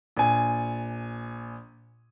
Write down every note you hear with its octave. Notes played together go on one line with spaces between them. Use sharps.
A#1 G#5